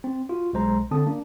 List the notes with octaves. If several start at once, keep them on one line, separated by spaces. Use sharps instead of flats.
C4
F4 F#4
B1 G#3 C5 A#5
D3 C4 A5 D#6
A#3 D4